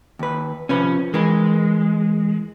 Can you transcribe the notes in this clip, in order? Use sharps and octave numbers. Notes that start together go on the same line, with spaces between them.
D#2 B4
C3 F3 C#4 B4
E3 G#3 A#4 B4